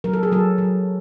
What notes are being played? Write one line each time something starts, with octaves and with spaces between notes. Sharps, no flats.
F#3 A#4
A4
G#4
F#3 A4
F#3